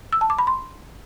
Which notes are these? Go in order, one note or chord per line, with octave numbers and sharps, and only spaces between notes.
E6
A5
D6
B5
C6